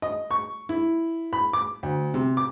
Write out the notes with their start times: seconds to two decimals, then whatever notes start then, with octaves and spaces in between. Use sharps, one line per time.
0.02 D#5
0.31 C#6
0.69 E4
1.33 B5
1.53 D6
1.83 D2
2.14 C3
2.37 D6